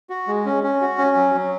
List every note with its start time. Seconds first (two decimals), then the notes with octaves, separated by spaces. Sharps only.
0.10 F#4
0.27 G#3
0.46 C#4
0.63 C#4
0.81 F#4
0.98 C#4
1.16 F#3
1.34 F#3